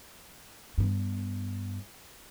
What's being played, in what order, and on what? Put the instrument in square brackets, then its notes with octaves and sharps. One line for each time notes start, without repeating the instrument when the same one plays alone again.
[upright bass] G2 B3